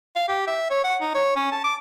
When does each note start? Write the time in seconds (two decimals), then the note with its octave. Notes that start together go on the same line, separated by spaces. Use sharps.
0.16 F5
0.28 G4
0.47 E5
0.70 C#5
0.84 F#5
1.01 D#4
1.15 C#5
1.36 C#4
1.52 A5
1.64 D6